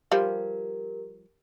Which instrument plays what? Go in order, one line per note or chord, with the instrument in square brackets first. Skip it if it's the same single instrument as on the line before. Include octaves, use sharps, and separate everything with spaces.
[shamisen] F3 G3 [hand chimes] G4 A#4